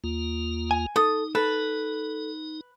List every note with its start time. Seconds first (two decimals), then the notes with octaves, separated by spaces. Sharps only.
0.04 D#2 A#3 F4
0.71 G#5
0.96 D#4 A4 D#6
1.35 A4 B4